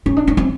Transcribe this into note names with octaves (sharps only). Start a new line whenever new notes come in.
C#4
D4
C#4
C4